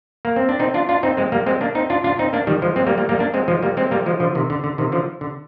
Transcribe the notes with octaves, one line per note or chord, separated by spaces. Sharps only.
A#3
C4
D4
C4 D#4
D4 F4
D4 F4
C4 D#4
G#3 C4
G3 A#3
G#3 C4
A#3 D4
C4 D#4
D4 F4
D4 F4
C4 D#4
A#3 D4
D#3 G3
F3 G#3
G#3 C4
G3 A#3
G3 A#3
G3 A#3
A#3 D4
G#3 C4
F3 G#3
G3 A#3
G#3 C4
G3 A#3
F3 G#3
D3 F3
C3 D#3
D3
D3
C3 D#3
D3 F3
D3